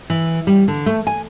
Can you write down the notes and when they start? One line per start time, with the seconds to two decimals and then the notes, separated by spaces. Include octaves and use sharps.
0.10 E3
0.47 G3
0.68 D3
0.86 A3
1.07 G#5